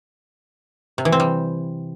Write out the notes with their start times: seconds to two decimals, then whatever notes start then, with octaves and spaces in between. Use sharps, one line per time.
0.98 C3
1.05 E3
1.12 C4
1.20 G3